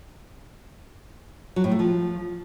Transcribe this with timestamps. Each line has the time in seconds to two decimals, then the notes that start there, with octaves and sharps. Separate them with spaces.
1.56 F#3
1.64 A2
1.72 A3
1.79 F3